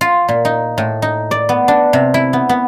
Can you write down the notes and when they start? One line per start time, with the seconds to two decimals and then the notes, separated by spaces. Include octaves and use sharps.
0.01 F4
0.28 A#2
0.45 D#4
0.78 A2
1.02 D#4
1.31 D5
1.49 B3
1.68 D4
1.93 C3
2.14 E4
2.33 B3
2.49 B3